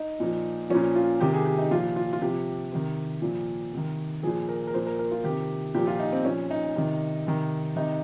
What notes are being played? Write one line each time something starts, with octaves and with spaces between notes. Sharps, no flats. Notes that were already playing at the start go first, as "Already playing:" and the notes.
Already playing: D#4
A#2 F3
A#2 F3 C#4
F4
C3 D#3 G4
G#4
G4
D#4
A#2 F3 F4
F4
F4
C3 F3 G4
C3 D#3
A#2 F3
C3 D#3
A#2 F3 G#4
A#4
A#4
A#2 F3 C5
A#4
A#4
F4
C3 D#3 G4
A#2 F3 G4
F4
D#4
C4
A#2 F3 C#4
D#4
C3 D#3
C3 D#3
C3 D#3 D#4